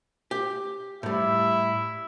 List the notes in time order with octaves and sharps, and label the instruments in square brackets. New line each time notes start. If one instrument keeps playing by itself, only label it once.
[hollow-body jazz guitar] G4
[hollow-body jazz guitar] A2 G3 [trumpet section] E4 E5